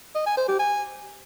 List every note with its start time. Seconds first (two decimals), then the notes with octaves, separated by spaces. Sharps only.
0.15 D#5
0.26 G#5
0.37 C5
0.48 G4
0.59 G#5